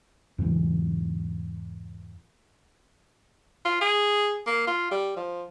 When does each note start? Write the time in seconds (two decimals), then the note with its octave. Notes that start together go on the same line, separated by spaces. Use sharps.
0.38 E2 G#2 C#3 E3
3.65 F4
3.82 G#4
4.47 A#3
4.67 F4
4.91 G3
5.17 F3